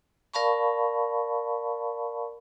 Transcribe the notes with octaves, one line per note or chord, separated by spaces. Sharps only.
A#4 D5 F5 A5 B5 C#6